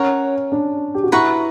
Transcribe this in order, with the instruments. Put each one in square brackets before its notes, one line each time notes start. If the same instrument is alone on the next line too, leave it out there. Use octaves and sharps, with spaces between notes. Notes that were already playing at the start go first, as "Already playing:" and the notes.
Already playing: [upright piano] C#4 [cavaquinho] A#4 C#5 F#5
[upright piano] D4
G4
F#4
[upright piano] E4 [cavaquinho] B4 F#5 A#5 C#6